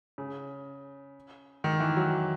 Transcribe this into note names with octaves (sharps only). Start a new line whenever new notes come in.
C#3
D#3
E3
F#3